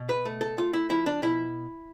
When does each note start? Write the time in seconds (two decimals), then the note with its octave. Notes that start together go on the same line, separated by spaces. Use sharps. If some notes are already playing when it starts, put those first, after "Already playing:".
Already playing: B2
0.09 B4
0.25 A3
0.41 A4
0.58 A3 F4
0.73 E4
0.90 F3 E4
1.06 D4
1.22 B2 E4